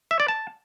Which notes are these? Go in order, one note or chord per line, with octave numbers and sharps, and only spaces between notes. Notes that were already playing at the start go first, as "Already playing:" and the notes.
E5
D5
A5